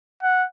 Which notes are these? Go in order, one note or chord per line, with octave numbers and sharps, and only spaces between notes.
F#5